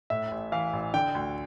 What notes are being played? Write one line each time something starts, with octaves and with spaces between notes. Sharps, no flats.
A2 E5
A1
E3 F5
A1
D3 G5
D2